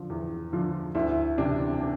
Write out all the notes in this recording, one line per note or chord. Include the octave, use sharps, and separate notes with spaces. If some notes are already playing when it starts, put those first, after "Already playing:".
Already playing: D3 F3
E2
D3 F3
D2 E4
C3 E3 D4
D4